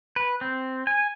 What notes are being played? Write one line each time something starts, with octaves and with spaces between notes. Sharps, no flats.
B4
C4
G#5